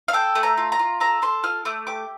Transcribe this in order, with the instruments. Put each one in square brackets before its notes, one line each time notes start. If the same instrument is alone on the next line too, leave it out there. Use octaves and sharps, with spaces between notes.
[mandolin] F5
A4 G5
A3
A#5
F4
A#5
F4
A4 A#5
A4 C6
F4 F6
A3 D6
G4 D6